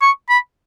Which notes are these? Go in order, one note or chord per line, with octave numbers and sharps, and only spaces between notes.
C#6
B5